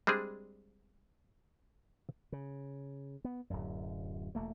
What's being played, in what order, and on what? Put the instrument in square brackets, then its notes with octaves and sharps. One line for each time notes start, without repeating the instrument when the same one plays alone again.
[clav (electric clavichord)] G3 G#3 C4 D4 G#4
[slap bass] C#3
B3
D1 F#2
E1 A3 A#3